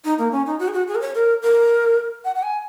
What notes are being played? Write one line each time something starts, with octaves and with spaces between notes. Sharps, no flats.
D#4
A#3
C#4
D#4
F#4
G#4
F#4
G#4
A#4
C#5
A#4
A#4
F#5
F#5
G#5